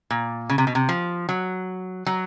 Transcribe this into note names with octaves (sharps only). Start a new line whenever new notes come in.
A#2
C#3
C3
B2
C3
F3
F#3
F#3